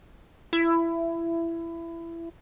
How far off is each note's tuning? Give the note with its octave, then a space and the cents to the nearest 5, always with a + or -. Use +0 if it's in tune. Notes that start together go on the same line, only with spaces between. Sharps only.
E4 +20